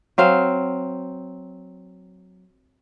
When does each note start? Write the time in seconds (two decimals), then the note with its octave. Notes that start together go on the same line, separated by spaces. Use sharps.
0.18 F#3 C4 F5